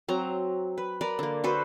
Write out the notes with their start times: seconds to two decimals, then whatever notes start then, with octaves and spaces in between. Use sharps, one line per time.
0.08 F#3 C4 A#5
0.78 B4
1.01 A#4 B4 D5
1.19 D3 A#3
1.44 F#4 A4 B4 C5